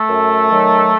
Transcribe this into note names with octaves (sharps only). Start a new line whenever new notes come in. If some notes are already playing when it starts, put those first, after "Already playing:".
Already playing: A3 A4
F#2
D#3 F#3